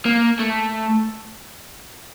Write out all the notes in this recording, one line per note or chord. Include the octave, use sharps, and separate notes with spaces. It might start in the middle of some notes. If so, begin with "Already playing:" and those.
A#3
A3